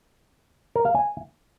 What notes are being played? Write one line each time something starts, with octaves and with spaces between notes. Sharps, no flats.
A#4
F5
G#5